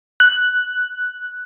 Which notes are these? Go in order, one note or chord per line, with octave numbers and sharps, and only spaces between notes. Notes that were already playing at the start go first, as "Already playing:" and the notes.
F#6